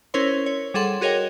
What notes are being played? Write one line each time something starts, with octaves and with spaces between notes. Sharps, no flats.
C#4 E4 A#4 C5 C#5 C6
C#5
G3 G#4 A4 F#5 C6
F#4 G#4 A#4 C#5 D#5 G5